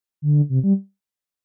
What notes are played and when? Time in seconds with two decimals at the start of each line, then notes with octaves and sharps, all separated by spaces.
0.22 D3
0.49 C3
0.63 G3